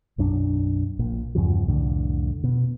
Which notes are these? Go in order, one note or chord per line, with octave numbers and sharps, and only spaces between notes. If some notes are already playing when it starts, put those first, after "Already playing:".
B1 F#2 D4
A#1 A#2
E2 G2 C#3 F3
C2 F2 A2 D3
B2